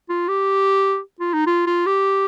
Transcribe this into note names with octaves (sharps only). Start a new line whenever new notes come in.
F4
G4
F4
D#4
F4
F4
G4